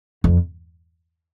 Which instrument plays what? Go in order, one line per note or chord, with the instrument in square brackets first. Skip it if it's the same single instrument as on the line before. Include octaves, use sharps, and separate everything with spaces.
[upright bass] F2